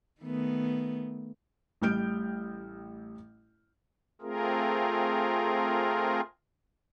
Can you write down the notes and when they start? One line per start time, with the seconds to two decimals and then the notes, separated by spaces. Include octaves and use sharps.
0.21 D#3 A3 B3
1.82 A1 G3 F6 G6 D7
4.21 A3 C4 F4 G#4 A#4